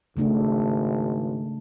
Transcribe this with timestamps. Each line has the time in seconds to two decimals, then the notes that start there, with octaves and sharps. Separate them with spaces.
0.17 G#1 C#3 A3 D4